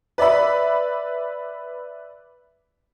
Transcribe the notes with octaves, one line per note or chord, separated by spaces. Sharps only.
B4 D5 E5 B5